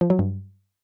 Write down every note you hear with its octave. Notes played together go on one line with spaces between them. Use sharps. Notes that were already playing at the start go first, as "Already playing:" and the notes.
F3
F#3
G2